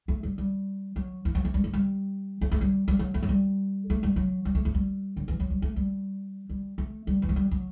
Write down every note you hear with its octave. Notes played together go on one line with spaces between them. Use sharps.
A3
G3
G3
F#3
E3
F#3
A3
G3
A3
G3
A3
A3
G3
G3
F#3
A3
F#3
G3
A3
G3
F#3
G3
A3
A3
G3
D3
E3
F#3
G3
A3
G3
G3
A3
G3
E3
F#3
G3
F#3